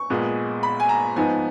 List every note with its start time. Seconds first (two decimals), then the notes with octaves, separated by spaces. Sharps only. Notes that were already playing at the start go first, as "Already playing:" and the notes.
Already playing: C#6
0.10 A#1 A#2 G#3 B3
0.63 B5
0.80 G#5
0.89 A#5
1.16 G#2 F3 B3 D#4 G#5